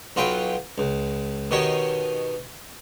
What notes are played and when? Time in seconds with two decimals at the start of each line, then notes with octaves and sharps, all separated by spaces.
0.16 B1 F#3 F4 B4 G5
0.78 C#2
1.51 B2 D#3 G4 C#5